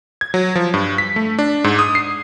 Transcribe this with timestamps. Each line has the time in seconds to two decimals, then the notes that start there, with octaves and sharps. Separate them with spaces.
0.21 G#6
0.34 F#3
0.55 F3
0.74 G2
0.98 B6
1.16 A3
1.39 D4
1.64 G#2
1.79 D#6
1.95 C7